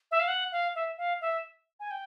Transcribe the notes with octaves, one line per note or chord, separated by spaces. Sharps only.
E5
F5
F#5
F5
E5
F5
E5
G#5
G5